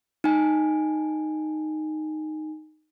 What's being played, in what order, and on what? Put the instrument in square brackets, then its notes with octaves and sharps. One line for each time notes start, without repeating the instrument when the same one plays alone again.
[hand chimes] D#4 G#5